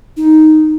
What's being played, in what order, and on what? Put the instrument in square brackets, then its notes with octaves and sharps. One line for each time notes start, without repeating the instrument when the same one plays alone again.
[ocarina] D#4